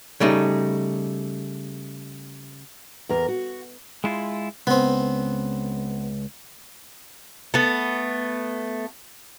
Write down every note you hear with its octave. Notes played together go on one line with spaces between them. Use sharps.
C#3 G3 A3 D#4
E2 A#4
F#4
G#3 E4 F4
C#2 B3 C4
A3 B3